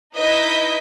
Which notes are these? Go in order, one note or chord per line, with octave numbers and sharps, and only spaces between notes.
D#4 E4 B4 D#5 G6 B6